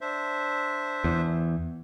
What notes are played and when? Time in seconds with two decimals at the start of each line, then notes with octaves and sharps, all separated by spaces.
0.01 D4 C5 E5
1.04 E2